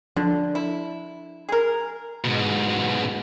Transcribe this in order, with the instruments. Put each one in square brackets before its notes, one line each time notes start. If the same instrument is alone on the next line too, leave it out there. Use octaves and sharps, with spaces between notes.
[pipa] D3 [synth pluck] F3 D4
[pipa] E4
G#4 A#4
[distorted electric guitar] G#2 B2